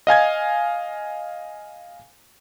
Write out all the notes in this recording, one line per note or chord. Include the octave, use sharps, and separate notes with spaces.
D#5 F5 G#5 G#6